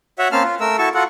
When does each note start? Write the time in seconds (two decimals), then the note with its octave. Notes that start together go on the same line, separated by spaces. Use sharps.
0.19 F#4 C#5 E5 F#5
0.32 A#3 C4 C#4 F5 A5 F6
0.44 F4
0.60 A3 A#4 E6
0.78 E4 F#4 A4 A5 C#6
0.95 F4 F#4 A4 F#5